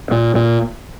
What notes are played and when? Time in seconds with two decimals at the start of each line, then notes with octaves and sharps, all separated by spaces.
0.11 A#2
0.35 A#2